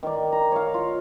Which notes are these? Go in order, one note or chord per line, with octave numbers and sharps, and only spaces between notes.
D#3 D5
A#5
C#5 F5
F4